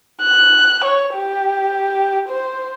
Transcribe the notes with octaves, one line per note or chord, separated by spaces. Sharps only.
F#6
C#5
G4
C5